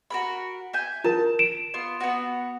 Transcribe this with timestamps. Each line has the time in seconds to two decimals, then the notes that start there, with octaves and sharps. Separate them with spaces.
0.10 F#4 A#4 B5
0.73 E5 G#5 G6
1.04 F4 A#4 A5
1.39 D7 E7
1.74 B3 F4
2.00 B3 F#4